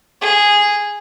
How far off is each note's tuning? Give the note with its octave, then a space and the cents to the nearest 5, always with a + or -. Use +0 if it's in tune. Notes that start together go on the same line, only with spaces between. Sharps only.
G#4 -10